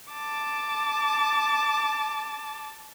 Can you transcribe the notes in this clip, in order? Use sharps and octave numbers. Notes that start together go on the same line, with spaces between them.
A5 D6